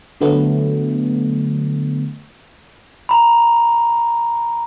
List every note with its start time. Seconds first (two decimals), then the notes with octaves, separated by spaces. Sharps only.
0.21 D3 F#3 A3 B3
3.09 A#5 B5